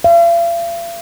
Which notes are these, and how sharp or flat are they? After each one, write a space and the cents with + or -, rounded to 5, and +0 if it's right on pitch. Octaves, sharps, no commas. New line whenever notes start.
F5 -45